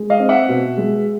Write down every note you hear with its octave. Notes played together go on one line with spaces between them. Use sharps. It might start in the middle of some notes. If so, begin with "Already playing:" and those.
Already playing: G#3
D#5 F5
C4
E5 F#5
B2
G#3